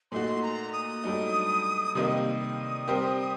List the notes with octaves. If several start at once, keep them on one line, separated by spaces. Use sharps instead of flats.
A#2 A3 D#4 F#4 C6
A#5
D#6
G2 F#3 A3 D#4
C3 D#3 G3 A#3 D#4 D#6
G3 C4 G4 A#4